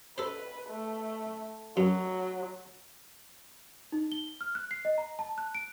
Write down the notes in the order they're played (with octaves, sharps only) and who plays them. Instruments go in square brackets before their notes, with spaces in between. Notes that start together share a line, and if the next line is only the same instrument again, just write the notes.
[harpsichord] A4 C5 [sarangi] B4
[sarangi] A3
[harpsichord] F#2 [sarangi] F#3
[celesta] D#4
G7
F6
F#6
C7
D#5
A#5
A5
F#6
D7